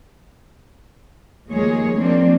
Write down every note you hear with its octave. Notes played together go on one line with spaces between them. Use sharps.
D#2 F3 G#3 A#3 G#4 C#5
F3 A#3 C4 D4